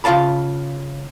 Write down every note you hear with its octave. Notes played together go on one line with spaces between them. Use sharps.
C#3 F4 D#5 F5 A5 B5